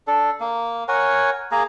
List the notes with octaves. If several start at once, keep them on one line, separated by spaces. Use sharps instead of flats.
D4 A4
A#3
A#4 C#5 F#5 G#5
A#3 G#4 A#5